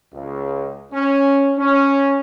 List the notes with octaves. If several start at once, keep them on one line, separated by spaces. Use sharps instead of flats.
C#2
C#4
C#4